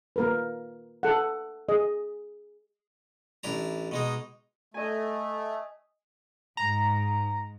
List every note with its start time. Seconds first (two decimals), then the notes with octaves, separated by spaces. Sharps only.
0.16 A#3 A#4 B4
1.03 A4 F#5
1.69 G#4 D#5
3.43 A1 D4 E4 A#5
3.91 B2 G#3 D#4
4.74 A3 D#5 G#5
6.57 G#2 A#5